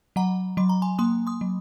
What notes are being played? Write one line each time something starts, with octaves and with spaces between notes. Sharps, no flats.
F#3 F#5 A#5
F#3 C6
A#5
G#5 C6
A#3 C6 D#6
C6 D#6
F#3